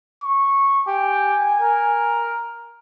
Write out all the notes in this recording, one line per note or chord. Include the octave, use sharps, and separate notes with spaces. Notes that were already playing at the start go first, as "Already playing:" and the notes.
C#6
G4 G#5
A#4